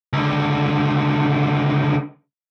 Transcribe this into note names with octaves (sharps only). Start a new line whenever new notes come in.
C#2 D3